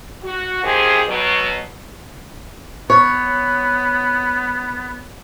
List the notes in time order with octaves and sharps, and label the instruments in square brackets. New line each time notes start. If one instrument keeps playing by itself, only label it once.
[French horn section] F#4
D#3 F3 C4 G4 G#4
B2 F#3
[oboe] B3 [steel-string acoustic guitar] C#5